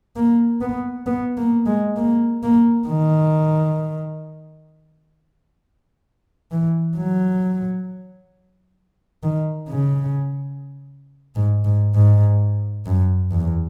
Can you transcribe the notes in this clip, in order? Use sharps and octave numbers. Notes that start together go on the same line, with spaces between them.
A#3
B3
B3
A#3
G#3
A#3
A#3
D#3
E3
F#3
D#3
C#3
G#2
G#2
G#2
F#2
E2